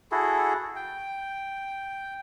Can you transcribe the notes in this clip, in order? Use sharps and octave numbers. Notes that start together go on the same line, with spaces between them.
E4 F#4 G#4 A4
G5